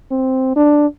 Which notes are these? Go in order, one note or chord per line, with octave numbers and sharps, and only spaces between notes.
C4
D4